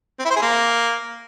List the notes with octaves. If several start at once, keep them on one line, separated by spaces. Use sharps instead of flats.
C4
E4
C5
G#4
A#3